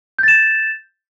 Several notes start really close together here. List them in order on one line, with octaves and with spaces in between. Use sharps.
G6 A6 E7